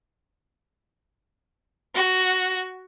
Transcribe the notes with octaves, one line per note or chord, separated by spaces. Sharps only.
F#4